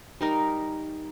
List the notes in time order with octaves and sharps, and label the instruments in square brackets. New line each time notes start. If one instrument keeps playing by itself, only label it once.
[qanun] G3 D#4 A#4